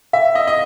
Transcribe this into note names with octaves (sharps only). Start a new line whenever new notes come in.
E5
D#5
D#5